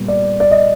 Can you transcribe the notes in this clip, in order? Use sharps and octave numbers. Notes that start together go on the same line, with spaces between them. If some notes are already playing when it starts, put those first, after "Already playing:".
Already playing: A#2 G3 B3
D5
D5
D#5